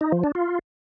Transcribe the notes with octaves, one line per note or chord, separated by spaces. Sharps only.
D#4
F3
D4
F4